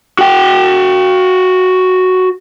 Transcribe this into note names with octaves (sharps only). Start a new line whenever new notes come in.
F#4 G5